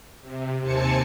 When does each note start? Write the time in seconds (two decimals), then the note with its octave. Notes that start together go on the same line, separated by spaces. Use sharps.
0.21 C3
0.61 D#2 C3 C4 G#5 A5 C#7